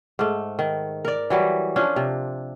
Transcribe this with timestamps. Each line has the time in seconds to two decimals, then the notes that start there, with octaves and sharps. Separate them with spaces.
0.19 G#2 A3
0.59 D#3
1.05 A#4 D5
1.30 E3 F#3 G3
1.76 F3 C#4 D4
1.96 C3